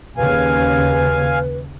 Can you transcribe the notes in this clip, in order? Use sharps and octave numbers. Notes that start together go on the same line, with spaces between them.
D#2 C#3 B4 F5 G#5